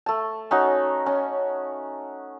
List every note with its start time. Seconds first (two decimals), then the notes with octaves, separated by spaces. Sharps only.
0.06 A3 A5
0.51 C#4 D#4 F#4
1.06 C#4